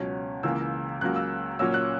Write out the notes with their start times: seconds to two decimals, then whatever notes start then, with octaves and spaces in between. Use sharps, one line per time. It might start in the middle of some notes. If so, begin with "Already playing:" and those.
Already playing: C#2 B2 F#3 C#4
0.43 C#2 C#3 E3 A#3 E6
1.01 C#2 C#3 F#3 A#3 F#6
1.16 E6
1.59 A#2 F#3 A#3 C#4 E6
1.74 F#6